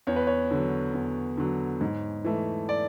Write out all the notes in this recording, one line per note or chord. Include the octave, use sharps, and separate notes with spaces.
E2 C#5
B4
C#5
D3 F#3
E2
D3 F#3
G#2
E3 A3
D5